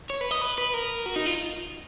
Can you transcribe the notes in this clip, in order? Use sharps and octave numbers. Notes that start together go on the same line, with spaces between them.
C#5
B4
D#5
B4
B4
A#4
F#4
D#4
F4